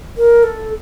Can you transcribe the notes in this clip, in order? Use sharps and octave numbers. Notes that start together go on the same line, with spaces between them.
A#4
A4